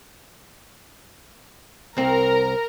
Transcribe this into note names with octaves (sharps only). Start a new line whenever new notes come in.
C2 C4 A#4 A#5